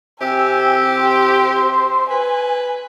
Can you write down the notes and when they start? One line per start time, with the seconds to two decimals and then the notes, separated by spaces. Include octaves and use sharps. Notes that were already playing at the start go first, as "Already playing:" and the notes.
0.21 C3 C4 G4 G#5 E6
1.00 C5
2.11 B4 G#5